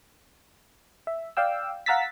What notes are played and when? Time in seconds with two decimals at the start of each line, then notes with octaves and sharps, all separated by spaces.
1.07 E5
1.37 D5 F5 G5 E6
1.86 F5 F#5 A#5 E6 A6 B6